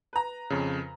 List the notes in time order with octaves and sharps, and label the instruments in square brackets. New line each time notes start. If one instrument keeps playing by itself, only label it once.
[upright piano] B4 A#5
[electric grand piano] F2 C#3